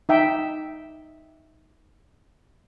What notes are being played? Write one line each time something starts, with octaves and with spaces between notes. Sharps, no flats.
D#4 E5 G5